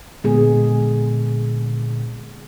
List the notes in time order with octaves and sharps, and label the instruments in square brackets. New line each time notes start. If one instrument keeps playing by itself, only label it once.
[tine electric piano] A#2 D3 [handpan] G#3 B3 G#4